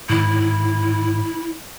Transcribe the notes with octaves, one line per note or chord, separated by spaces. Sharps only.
G#2 D#3 E4